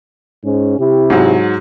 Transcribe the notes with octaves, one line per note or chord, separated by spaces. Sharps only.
G#2 C#4
C3 E4 G4
G#2 F#3